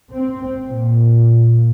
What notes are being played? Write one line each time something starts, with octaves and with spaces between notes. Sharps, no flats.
C4
A#2